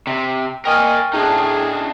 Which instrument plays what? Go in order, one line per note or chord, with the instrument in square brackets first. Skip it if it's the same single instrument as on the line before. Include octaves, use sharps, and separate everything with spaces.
[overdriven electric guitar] C3
[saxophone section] A#3 D#5 [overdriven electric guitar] A#4 G#5 [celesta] G5 C#6 F6
[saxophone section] A2 F#4 G#4 [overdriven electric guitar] D4 D#4